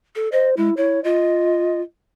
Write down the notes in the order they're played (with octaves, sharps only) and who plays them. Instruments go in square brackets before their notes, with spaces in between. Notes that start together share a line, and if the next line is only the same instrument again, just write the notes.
[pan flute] A4
[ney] C5 [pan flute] D#5
[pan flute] G#3 [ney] E4
[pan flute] E4 [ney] C#5
[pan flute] F4 [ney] D#5